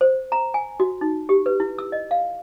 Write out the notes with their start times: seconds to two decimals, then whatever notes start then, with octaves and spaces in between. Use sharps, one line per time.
0.01 C5
0.32 A#5
0.54 G#5
0.80 F#4
1.01 D#4
1.29 G4
1.46 B4
1.60 E4
1.78 E6
1.92 D#5
2.11 F5